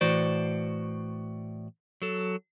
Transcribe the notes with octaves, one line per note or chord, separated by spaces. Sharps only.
A2 E3 F#4 C5 D5
F#3 A4